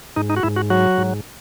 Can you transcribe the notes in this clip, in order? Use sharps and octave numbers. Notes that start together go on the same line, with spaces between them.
G#2 D#4
D#4
F#4
G#2 E4
F#4
F#3 F#4
G#2